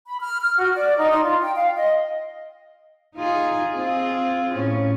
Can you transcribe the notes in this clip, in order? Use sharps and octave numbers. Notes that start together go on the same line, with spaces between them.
B5
F6
F6
F#4
D5
D#4
C6
F4
G5
F5
D#5
D#4 F4 G#4
C4 F4 G#4
A2 C#4